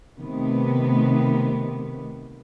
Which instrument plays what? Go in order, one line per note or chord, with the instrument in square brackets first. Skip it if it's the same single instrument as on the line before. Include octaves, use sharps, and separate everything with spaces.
[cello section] C3 D#3 A3 B3